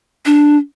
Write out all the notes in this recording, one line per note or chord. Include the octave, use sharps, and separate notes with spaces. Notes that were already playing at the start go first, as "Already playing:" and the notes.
D4